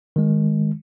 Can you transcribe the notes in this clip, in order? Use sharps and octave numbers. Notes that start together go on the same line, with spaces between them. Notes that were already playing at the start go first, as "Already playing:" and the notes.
D#3 G#3